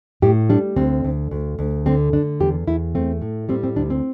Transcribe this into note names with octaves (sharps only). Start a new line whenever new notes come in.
A2 G4
G3 D4
D2 C4
D2
D2
D2
D3 C4
D3 D4
E2 G4
E2 E4
A3 C4
A2
G3 C4
C4
D2 D4
C4